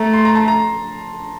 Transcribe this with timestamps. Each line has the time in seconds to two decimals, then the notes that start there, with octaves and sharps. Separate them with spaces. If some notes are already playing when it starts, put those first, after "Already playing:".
Already playing: A3 A#5
0.14 C6
0.25 A#5
0.35 A5
0.48 A#5